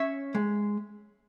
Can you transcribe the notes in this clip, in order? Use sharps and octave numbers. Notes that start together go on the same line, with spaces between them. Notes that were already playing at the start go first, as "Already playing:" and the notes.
Already playing: C#4 C#5 E5
G#3